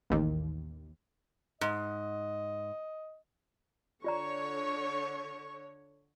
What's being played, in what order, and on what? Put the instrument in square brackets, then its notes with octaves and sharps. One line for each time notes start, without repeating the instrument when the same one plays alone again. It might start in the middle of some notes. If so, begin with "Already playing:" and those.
[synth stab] A1 D#2
[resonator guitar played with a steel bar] G#2 [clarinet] D#5
[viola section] D3 C#5 [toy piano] F4 D5 A#5 [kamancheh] C#6